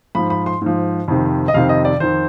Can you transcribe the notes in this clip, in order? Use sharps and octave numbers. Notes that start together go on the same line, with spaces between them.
G#2 F3 B5
B5
C6
G#2 F3
F2 C3 D#3
D#5
F2 C3 D#3 F5
D#5
D5
F2 D#3 C5